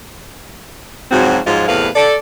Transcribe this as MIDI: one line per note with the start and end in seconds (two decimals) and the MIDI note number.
1.11 1.38 44
1.11 1.38 49
1.11 1.38 53
1.11 1.38 54
1.11 1.38 60
1.11 1.38 66
1.45 1.67 44
1.45 1.67 53
1.45 1.67 54
1.45 1.67 56
1.45 1.67 65
1.68 1.88 40
1.68 1.88 45
1.68 1.88 48
1.68 1.88 71
1.68 1.88 77
1.96 2.16 69
1.96 2.16 74